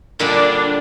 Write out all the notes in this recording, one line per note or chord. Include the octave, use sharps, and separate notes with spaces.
A#2 D3 G3 D4